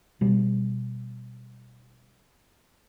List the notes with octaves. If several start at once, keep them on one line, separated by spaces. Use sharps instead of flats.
B2 G3